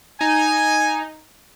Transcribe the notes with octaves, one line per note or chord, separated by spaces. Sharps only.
D#4 G#5